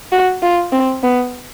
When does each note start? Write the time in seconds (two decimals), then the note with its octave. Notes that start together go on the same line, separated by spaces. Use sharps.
0.12 F#4
0.42 F4
0.72 C4
1.03 B3